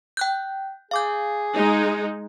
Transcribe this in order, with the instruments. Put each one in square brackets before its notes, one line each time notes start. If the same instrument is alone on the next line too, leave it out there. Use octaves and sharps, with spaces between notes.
[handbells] G5 F#6 G6
[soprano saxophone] G#4 [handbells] F5 D6 G6
[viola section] G#3 D#4